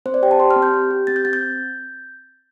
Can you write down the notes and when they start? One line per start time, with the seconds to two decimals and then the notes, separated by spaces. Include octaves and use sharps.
0.06 C4 C5
0.14 D5
0.22 G4 G5
0.31 A5
0.39 G4 C6
0.51 F6
0.56 C4
0.63 G6
0.74 G4
0.90 G4
1.07 C4 A6
1.16 G6
1.25 C4 A6
1.33 G6